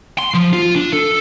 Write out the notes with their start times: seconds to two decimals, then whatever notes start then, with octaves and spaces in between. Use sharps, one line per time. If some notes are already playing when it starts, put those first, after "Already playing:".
0.19 C6
0.34 F3
0.53 F4
0.76 D4
0.93 A4